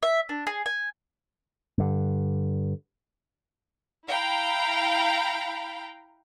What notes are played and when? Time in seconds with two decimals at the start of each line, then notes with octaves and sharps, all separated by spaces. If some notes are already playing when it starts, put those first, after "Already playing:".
0.03 E5
0.29 D4
0.47 G#4
0.66 G#5
1.78 G2 D3
4.08 E4 F5 G5 A#5 B5